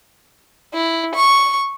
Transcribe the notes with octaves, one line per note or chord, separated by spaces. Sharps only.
E4
C#6